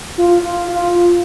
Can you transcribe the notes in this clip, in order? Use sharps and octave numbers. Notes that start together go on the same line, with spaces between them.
F4
F4
F4